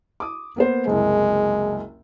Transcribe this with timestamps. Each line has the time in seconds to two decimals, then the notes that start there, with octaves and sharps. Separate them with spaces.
0.20 D6 D#6
0.56 A#3 B3 C5
0.87 F#1 C2 G#3